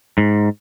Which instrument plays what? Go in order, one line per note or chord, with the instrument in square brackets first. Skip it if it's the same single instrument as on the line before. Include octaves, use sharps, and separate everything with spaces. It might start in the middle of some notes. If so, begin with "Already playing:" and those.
[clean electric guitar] G#2